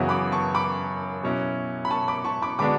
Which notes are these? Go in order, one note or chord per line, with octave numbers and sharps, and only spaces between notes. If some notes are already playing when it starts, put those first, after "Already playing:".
Already playing: F#2 C#3 E3 B3 F#4 C#5 E5
B5 D6
A5 C#6
B5 D6
B2 F#3 C#4 E4
B5
A5 C#6
B5 D6
A5 C#6
B5 D6
D3 G#3 B3 D4 F#4 B5 D6